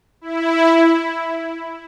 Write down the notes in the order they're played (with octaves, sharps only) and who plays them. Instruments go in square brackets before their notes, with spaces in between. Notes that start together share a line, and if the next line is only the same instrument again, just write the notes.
[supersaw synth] E4